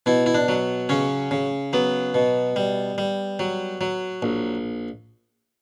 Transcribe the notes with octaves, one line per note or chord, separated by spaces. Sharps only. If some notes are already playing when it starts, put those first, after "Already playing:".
B2 E4
E4
D4
F#3
C#3 C#4
C#3
F#3 B3
B2
G3
G3
F#3
F#3
A#1